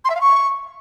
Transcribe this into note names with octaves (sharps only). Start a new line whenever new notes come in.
C6
E5
F5
C#6